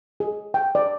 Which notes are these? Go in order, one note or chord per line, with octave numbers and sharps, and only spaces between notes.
G#4
G5
D5